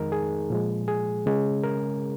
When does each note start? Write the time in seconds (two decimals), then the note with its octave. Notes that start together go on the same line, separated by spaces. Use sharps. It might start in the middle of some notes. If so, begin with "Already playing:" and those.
Already playing: F2 D#3 G#3 D#4 A#4
0.12 G#4
0.50 A#2 F3 G#3
0.88 G#4
1.26 C#3 G#3 C#4
1.63 A#4